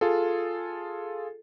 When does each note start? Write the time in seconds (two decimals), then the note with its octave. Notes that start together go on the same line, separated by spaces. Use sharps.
0.01 F4 G#4 A4